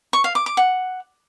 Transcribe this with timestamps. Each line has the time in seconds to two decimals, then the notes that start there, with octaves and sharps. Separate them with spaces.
0.13 C#6
0.24 F5
0.35 D6
0.46 D6
0.57 F#5